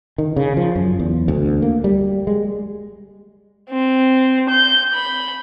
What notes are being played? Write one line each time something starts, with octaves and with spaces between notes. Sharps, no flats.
D#3
C#3
F3
F#2
E2
D2
A#3
G3
G#3
C4
G6
B5